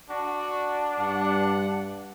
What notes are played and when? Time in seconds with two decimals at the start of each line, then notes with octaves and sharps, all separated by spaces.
0.10 D4 F#4
0.99 G2 F#5